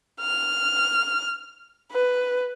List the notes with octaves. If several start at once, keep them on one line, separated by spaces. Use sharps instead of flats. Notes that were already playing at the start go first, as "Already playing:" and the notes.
F6
B4